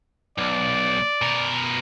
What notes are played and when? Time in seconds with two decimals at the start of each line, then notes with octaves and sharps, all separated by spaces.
0.38 B1 D5
1.22 B2 A#4